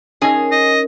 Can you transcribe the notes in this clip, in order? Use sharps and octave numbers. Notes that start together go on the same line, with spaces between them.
C#4 D#4 G#4 A#4 G#5
D#5